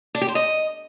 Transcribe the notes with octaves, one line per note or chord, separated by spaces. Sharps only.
D4
G4
C5
D#5